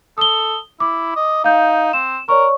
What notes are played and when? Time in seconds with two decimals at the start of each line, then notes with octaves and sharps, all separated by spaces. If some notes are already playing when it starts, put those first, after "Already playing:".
0.18 A4 D#6 G7
0.80 E4 D6
1.16 D#5
1.44 D#4 F5 G6
1.93 C4 E7
2.29 A#4 C#5 D5 C#6